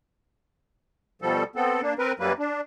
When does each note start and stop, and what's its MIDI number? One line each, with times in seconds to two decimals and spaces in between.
1.22 1.44 47
1.22 1.44 53
1.22 1.44 55
1.22 1.44 69
1.56 1.81 59
1.56 1.81 60
1.56 1.81 69
1.82 1.94 58
1.82 1.94 62
1.99 2.13 60
1.99 2.13 70
1.99 2.13 71
2.20 2.33 42
2.20 2.33 54
2.20 2.33 55
2.20 2.33 58
2.20 2.33 71
2.39 2.61 62